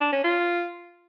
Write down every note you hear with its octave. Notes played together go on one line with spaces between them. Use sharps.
D4
C#4
F4